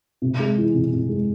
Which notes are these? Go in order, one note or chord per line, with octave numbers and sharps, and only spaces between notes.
C3
G#3
E3
C3
C3
G#3